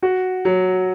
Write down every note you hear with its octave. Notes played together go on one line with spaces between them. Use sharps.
F#4
F#3